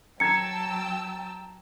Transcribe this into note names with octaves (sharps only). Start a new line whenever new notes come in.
F#3 G5 A5 A#5 E6 G#6 C#7